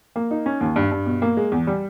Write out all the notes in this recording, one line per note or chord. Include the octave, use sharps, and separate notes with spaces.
A#3
D#4
C#4
D#2
G2
G2
B2
A#3
G#3
E2
G3